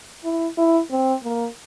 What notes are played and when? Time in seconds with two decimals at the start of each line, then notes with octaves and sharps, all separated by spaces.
0.24 E4
0.58 E4
0.91 C4
1.24 A#3